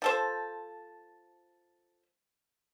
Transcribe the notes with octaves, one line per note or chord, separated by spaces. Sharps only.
F3 A4 C5